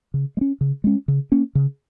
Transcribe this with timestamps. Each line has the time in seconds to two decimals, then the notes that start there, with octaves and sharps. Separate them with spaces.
0.14 C#3
0.37 G#3
0.41 C#4
0.61 C#3
0.84 G#3 C#4
1.08 C#3
1.32 A#3 C#4
1.55 C#3